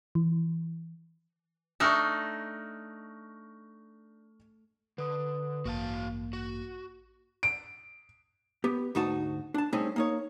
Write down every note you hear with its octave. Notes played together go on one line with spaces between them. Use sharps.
E3
A3 D4 D#4 C#6 F6 A#6
D3 B4 D#6
A1 G2 A#3 F#4 F5 A5
F#4
D7
B3 G4
D2 G#2 D#4 F#4 A5
D4 A5
G3 A3 C4 C#4 D#4 G#4
A#3 D#4 C#5